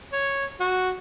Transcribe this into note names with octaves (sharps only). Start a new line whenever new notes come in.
C#5
F#4